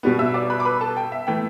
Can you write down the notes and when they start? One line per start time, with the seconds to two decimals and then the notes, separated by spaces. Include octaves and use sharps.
0.03 B2 G3 B3
0.19 E5 E6
0.34 D5 D6
0.50 B4 B5
0.60 D6
0.65 B4 B5
0.81 A4 A5
0.97 G5
1.12 E5
1.27 E3 A3 G5